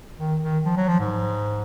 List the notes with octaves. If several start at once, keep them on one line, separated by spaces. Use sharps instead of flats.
D#3
D#3
F3
F#3
F3
G#2